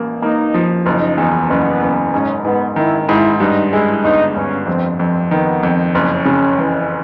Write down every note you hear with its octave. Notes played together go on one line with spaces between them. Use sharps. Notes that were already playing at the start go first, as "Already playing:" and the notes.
Already playing: A1 A#3
A#3 D#4
F3
F#1 D#4
E2
F#1 B3
F#1
G#2 C#4
G#2 B3
D#3 E4
G#2 E4
G2 D#4
G#3 E4
G1 D#4
G1 C#4
F2 C4
F2 C4
D#3 B3
F2
F#1 C#4
C#3
E3